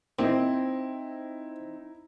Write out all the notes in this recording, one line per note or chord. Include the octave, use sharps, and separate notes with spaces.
A#2 C4 D#4 E4 D#5